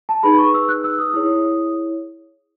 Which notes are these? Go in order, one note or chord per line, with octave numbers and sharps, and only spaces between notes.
A5
D#4 G#4 B4 B5
C#6
E6
F#6
E6
D#6
E4 G#4 C#5